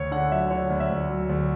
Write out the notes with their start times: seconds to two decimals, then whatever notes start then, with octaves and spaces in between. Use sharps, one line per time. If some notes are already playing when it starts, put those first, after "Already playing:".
Already playing: D2 C#5
0.11 D3 F#5
0.32 F#3 E5
0.50 D3 C#5
0.70 D2
0.80 E5
0.90 D2
1.09 F#3
1.29 D2